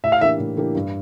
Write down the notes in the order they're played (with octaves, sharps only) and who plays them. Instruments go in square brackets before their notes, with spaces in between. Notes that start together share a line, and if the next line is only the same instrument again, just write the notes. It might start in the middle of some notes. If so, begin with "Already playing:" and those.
[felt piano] A2 [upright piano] E5
[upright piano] F5
[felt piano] E3 A#3 D4 G4 [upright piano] E5
[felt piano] A2
E3 A#3 D4 G4
G2